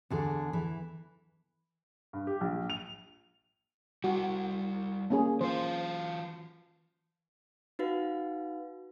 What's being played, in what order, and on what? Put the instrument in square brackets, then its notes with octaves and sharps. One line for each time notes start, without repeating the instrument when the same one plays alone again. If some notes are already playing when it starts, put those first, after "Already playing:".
[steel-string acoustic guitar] E2 D3 G#4
E3
[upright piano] G2
G4
A#1
F7
[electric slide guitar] G3 E4 [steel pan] F#4
[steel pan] A#3 C#4 G#4
[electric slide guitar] E3 F4 F5 [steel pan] C5
[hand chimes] D#4 F#4 B4 F5